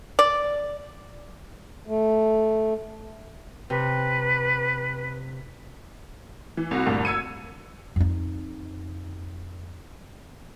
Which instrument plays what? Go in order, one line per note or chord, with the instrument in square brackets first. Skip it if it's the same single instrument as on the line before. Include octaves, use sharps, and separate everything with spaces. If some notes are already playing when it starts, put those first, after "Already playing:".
[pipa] D5
[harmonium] A3
[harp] C3 [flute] B4
[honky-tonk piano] E3
C2 F#4
D2 G2 A#2
E6 G#6 C#7 D#7
[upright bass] F2 D#4